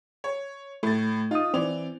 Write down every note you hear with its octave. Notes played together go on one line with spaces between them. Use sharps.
C#5
A2 A3 A6
D#4 F4 D#6
E3 C4 D5 F7